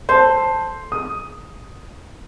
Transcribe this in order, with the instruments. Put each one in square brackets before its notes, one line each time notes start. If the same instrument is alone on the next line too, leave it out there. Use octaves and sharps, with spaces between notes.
[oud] A4 [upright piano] C5
[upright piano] D#6